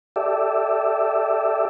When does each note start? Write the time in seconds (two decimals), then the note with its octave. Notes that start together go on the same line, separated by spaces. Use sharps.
0.16 G4 A4 D5 E5